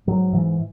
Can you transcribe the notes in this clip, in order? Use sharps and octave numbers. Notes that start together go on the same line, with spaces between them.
G#2 F#3
G#2 E3